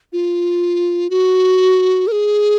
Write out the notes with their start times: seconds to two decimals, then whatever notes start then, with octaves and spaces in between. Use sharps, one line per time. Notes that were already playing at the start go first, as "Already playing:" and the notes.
0.13 F4
1.10 F#4
2.07 A#4
2.12 G#4